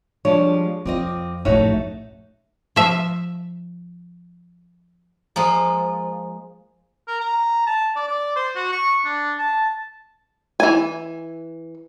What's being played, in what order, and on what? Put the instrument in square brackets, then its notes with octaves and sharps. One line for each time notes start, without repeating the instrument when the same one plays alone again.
[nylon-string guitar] F3 G3 G#3 [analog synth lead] D4 [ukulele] C#5
[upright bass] F2 [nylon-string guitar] C4 F4 D#5 [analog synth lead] D6
[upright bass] A#1 A2 [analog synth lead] F#2 [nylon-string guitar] A3 D#4 [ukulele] F#4 C#5 E5
[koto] F3 E5
F3 G#3 A#3
[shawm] A#4
A#5
A5
D5
D5
C5
F#4
C#6
D4
A5
[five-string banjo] E3 G#5